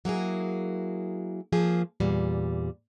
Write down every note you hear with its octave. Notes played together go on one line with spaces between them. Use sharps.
F#3 A#3 E4 G#4
F3 A#3 G#4
E2 A#2 G3